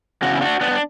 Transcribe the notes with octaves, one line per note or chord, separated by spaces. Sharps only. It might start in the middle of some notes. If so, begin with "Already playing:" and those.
E2 C#3 F#4
E4
D4 F#4
B3 D4
D4